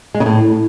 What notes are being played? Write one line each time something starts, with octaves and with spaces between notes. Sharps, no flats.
G#3
C#3
A2